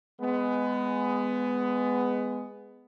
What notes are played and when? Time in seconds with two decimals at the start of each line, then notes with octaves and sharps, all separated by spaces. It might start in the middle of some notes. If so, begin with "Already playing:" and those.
0.20 G#3 B3